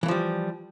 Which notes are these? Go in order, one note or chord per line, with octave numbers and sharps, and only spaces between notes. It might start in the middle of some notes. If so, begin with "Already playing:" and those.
E3 F3 G3 A3